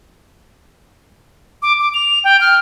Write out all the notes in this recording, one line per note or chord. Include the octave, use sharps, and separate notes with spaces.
D6
D6
F7
G5
F6